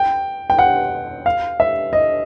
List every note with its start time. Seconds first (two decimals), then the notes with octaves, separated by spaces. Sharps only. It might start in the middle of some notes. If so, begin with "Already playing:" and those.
Already playing: G5
0.50 G5
0.59 F#5
1.26 F5
1.60 E5
1.93 D#5